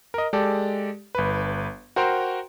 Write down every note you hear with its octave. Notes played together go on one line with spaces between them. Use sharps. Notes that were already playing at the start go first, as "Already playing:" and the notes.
A#4 D#5
G#3 G4 A4 D5
G1 B4
F#4 A#4 C5 G5 A#5 C6